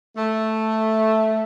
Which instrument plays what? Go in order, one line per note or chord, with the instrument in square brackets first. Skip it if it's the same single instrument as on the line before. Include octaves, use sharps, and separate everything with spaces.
[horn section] A3